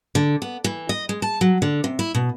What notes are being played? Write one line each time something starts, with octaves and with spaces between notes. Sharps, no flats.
D3
B3
E3
D#5
G#3
A5
F#3
D3
C3
E4
B2